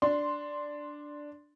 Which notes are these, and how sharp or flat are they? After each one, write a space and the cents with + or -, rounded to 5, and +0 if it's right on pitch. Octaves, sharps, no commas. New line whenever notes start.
D4 +0 C6 +0